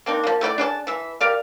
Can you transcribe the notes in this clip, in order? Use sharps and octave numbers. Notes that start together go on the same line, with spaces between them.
A#3 C4 D4 D#4
F3 A#3
A3 E4 G4 D5
D4 G#4 D5 A5
E3 E5
G4 A#4 D5 F5